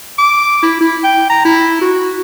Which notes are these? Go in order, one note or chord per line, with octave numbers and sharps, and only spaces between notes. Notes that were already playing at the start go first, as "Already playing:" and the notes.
D6
E4
E4
G5
A#5
E4
F#4